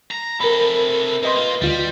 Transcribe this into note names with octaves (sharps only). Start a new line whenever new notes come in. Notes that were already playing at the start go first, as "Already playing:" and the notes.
A#5
C3 A4 A#4 B5
C3 B4 D#5 C6
A#3 F4
D2 G3 F4